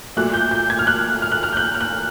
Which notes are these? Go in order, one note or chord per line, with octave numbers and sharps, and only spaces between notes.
A#2 F#3 A3 F#6
G6
G6
G#6
F6
F#6
F6
F#6
F6
G6
F#6
F6
F#6